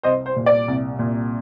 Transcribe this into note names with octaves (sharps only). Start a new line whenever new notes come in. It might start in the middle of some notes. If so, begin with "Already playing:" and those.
C2 C5 D#5
C5
A#2
D5
C2
A#2